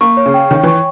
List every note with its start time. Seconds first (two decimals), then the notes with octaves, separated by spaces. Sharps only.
0.01 A#3 C#6
0.17 C#5
0.26 C#3
0.34 G5
0.51 D#3 C#5
0.63 E3 C#6